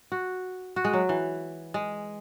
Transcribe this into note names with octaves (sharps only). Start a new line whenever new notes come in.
F#4
F#4
G#3
F#3
E3
G#3